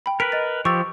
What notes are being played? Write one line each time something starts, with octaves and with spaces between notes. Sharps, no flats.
G5 B5
A#4 B4 B6 D7
D#5 A6
F3 G4 C#6 E6 A6